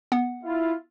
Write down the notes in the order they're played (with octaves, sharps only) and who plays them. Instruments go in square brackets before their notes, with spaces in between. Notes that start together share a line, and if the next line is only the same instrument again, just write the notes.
[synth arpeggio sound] B3 F#5
[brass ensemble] E4 F4